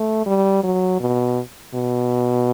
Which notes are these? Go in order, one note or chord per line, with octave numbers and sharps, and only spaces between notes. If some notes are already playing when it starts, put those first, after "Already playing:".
Already playing: A3
G3
F#3
B2
B2